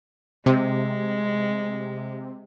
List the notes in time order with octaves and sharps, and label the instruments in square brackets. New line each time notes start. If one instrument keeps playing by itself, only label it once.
[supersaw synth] C3 [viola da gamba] G#3